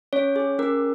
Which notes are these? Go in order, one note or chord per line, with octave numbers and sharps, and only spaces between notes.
C#4 C#5
G#4
C#4 A#4